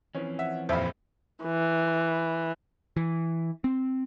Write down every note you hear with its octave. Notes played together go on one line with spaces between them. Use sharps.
E3 F3 C4 C#4
E5 F#5
D#1 F2 C5 E5 F5 B5
E3
E3
C4